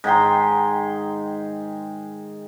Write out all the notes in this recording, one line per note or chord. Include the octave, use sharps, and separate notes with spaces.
G#2 D#3 G5 C6